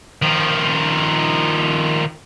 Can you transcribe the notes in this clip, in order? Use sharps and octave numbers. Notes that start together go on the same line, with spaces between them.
D#3 F3